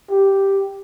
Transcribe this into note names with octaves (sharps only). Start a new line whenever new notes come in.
G4